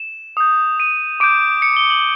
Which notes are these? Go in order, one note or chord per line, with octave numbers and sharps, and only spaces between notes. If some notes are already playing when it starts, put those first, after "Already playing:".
Already playing: E7
D#6 G6
D#7
D6 G6 D7
C#7
G7
F#7